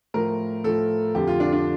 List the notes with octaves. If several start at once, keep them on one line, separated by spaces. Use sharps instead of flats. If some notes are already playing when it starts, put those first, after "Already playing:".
A2 F3 A#4
A2 F3 A4
F2 D3 F3 G4
F4
D4
D4